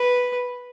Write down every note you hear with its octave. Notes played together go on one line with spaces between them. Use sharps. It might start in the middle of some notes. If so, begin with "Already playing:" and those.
Already playing: B4